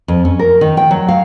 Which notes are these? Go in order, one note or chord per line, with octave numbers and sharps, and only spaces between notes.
F2
C#4
A#4
D#3
G5
F#3
F5